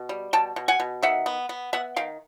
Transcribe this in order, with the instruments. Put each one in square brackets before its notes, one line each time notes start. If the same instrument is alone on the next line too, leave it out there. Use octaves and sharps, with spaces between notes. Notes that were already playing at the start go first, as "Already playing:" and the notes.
Already playing: [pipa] B2
G3
B2 G5 A5
B2
F#5 G#5
B2
D#3 E5 F#5
B3
B3
B3 E5 F#5
D#3 F5 G5